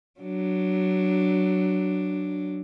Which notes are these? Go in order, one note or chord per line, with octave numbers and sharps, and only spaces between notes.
F#3 D4